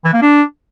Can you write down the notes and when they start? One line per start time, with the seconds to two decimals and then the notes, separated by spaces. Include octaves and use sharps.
0.04 E3
0.13 A#3
0.22 D4